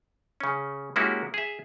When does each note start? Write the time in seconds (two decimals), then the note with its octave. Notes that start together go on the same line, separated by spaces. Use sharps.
0.40 C#3 C#4
0.96 G#3 A#3 C#4 E4 F#4 G4
1.34 G#4 E5